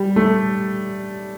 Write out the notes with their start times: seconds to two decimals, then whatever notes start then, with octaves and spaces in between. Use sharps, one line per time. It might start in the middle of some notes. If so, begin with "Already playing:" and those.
Already playing: G3
0.16 A3